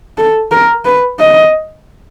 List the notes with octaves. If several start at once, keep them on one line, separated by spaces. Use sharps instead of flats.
A4
A#4
B4
D#5